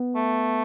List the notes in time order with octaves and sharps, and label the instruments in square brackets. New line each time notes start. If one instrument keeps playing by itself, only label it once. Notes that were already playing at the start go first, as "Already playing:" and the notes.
Already playing: [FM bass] B3
[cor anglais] A3